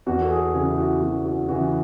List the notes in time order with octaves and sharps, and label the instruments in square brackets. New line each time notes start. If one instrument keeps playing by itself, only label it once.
[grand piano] E2 F#4
A4
G#4
C#3 E3 G#4
E4
F#4
E2 F#4
F#4
C#3 E3 F#4